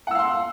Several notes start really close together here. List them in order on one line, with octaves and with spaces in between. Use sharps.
F#5 E6 F5 C6